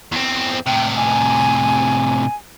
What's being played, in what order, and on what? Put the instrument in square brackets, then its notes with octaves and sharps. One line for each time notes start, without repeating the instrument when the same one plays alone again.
[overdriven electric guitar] E2 C4
[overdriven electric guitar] A2 C3 [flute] G5
[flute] G#5